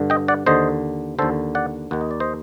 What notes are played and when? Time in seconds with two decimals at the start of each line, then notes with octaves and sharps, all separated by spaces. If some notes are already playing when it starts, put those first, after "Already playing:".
Already playing: G2 D3
0.10 D#5 G5
0.28 D5 F#5
0.46 D#2 D3 C5 D#5
1.19 D#2 D3 A4 C5
1.55 D5 F#5
1.91 D#2 D#3 F#5
2.01 D#5
2.11 D5
2.20 C5 D#5